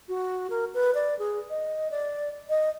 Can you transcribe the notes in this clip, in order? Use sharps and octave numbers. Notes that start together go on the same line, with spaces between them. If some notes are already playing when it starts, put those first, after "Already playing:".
F#4
A#4
B4
D5
G#4
D#5
D5
D#5